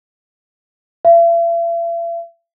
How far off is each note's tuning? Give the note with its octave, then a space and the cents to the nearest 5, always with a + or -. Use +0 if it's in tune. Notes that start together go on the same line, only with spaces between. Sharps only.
E5 +45